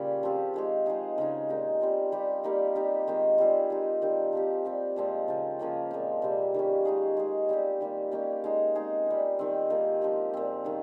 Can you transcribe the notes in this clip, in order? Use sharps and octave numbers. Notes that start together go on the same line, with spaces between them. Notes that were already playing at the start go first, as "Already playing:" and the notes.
Already playing: A#2 C#3 G3 C#4 F4
F3 C4 G4
D#3 G#3 C4 G4
F3 G#3 D#4 G#4
C#3 G#3 D#4
A#2 G#3 D#4 G4
G3 C4 F4
G3 C4 G4
G3 A#3 D#4
G3 C4 D#4 G4
D#3 G#3 C4 F4
G3 C4 F4 G#4
G#3 D#4 G4
D#3 G3 C4 G4
F3 C4 G4
G3 C4 G4
A#2 F3 G#3 C4
C#3 F3 C4 F4
C#3 F3 A#3 C#4
A#2 G#3 C4
C3 G3 C4
D#3 G3 C#4
G#3 D#4 G#4
G#3 C#4 G#4
G3 C4 G4
D#3 G3 A#3
G3 A#3 C#4 G4
G#3 D#4 G#4
G#3 C4 D#4 G#4
G3 C4 F4
D#3 G3 C4
D#3 A#3 F4 G#4
F3 G#3 C4 G4
A#2 F3 C4
D#3 G#3 C#4